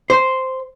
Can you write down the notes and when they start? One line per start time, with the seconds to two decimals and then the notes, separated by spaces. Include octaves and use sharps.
0.10 C5